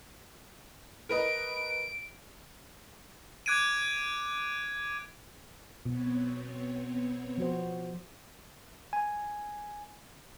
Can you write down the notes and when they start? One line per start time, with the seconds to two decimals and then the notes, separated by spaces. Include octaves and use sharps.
1.09 A#4 B4 D#5 D7
3.46 D6 F#6 G#6 D7 D#7
5.85 B2 B3 C4 C#5
7.38 F3 F#4 C5
8.93 G#5